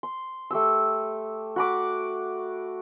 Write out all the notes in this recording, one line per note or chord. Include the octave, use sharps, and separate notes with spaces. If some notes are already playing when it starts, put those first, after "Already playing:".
C6
A3 G4 E6
F#4 B5 D6